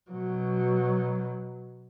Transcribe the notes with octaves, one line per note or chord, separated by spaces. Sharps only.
B2 F#3